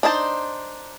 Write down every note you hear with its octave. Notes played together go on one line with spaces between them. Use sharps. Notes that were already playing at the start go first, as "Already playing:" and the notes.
D4 D#4 C5 A5